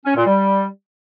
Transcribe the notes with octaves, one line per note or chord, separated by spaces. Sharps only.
C#4
A#2
G3